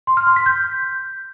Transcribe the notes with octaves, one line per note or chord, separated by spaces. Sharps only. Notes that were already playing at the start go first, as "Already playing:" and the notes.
C6
F6
C6
B6
G6